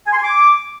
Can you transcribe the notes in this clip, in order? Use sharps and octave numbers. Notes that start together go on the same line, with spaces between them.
G#5
C6
G#5
D6